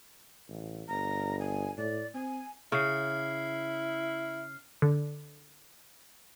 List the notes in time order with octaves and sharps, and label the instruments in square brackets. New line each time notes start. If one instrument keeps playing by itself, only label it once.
[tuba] A1
[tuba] G1 [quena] A#5
[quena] G#5
[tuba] A2 [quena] D5
[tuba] C4 [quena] G#5
[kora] C#3 [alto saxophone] E4 [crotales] F6 C7
[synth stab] D3